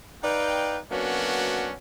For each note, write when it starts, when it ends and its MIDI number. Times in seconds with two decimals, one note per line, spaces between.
0.23 0.78 63
0.23 0.78 71
0.23 0.78 74
0.23 0.78 77
0.23 0.78 79
0.91 1.72 54
0.91 1.72 58
0.91 1.72 59
0.91 1.72 61
0.91 1.72 62
0.91 1.72 66